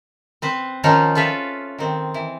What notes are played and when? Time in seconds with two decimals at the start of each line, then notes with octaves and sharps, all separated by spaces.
0.42 C4 B4 C5
0.84 D#3 F3 C#4 D#4 F4
1.15 F4 A4 B4 E5 F5
1.79 D#3 C4
2.14 E3